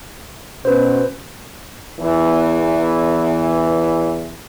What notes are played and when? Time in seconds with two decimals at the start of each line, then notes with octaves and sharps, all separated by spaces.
0.65 B2 C#4 B4 C5
2.00 E2 E3